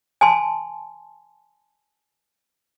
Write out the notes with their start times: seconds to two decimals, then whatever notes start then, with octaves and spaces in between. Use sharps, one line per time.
0.21 G#5 A5 C6